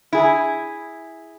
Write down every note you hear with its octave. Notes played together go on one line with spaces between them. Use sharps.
E4 G#4